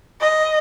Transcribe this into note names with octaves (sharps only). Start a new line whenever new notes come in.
D#5